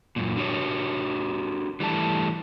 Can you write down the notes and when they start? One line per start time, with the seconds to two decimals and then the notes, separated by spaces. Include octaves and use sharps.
0.16 F#2 A#2
0.37 D4 F#4 G4 C#5
1.80 E3 G3 A3 A5